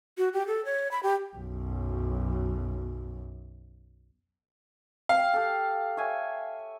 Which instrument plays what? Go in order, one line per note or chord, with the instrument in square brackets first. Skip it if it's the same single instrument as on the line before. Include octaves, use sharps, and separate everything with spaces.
[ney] F#4
G4
A4
C#5
B5
G4
[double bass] B1 F#2
[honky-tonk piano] F5 [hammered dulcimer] G5
[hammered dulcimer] G4 A4
C#5 E5 G#5